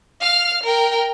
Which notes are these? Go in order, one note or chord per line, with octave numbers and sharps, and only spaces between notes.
F5 F6
A#4 G5